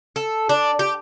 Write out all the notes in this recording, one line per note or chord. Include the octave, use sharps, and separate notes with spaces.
A4
D4
G4